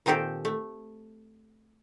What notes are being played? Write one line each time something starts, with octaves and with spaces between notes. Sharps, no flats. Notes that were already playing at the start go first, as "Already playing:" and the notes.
A#2 D#3 C4 G4 A4
A3